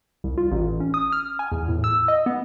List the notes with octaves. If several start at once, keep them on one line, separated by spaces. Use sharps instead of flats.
C2
F4
A1
C#4
D#6
F6
G#5
E2
A2
E6
D#5
B3